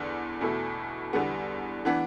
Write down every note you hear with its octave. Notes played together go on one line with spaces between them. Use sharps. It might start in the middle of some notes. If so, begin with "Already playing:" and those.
Already playing: E2 D3 B3 D4
E2 B2 A3 E4
E2 D3 G3 B3
E3 B3 D4